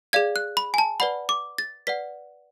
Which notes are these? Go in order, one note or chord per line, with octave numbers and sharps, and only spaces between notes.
G#4 D5 F5 G#6
F#6
B5
G#5
A5
B4 D5 F#5 B5
D6
A6
B4 D5 F#5 B6